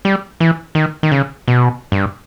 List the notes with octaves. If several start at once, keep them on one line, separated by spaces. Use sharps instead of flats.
G3
E3
D#3
D#3
C#3
B2
G2